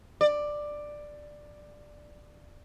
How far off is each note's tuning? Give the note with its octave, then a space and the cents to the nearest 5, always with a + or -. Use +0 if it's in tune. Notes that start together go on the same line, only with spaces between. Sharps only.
D5 +10